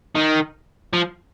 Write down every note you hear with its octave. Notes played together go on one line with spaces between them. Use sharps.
D#3
F3